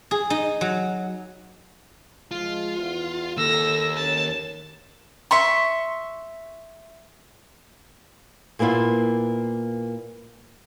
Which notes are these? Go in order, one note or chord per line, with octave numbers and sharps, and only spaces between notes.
G#4
D#4
F#3
F3 G#3 F4
E2
D#2 A4 E6 A#6
C#4 A#4 A5
E5 C6 C#6
A#2 A#3 B3 E4 F4